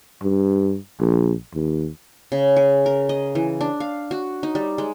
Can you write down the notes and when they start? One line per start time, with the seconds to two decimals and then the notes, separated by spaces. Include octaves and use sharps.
0.23 G2
1.00 A#1
1.54 D#2
2.32 C#3
2.56 G#4
2.86 A#4
3.09 D#5
3.35 E3
3.61 D4
3.80 F5
4.11 F#4
4.43 D#4
4.55 G3
4.78 G#3